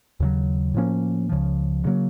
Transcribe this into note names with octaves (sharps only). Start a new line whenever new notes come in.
D#2 C#3 F#3
A2 F3 A#3 C#4
C#2 C#3 F3
D2 C#3 F#3 A#3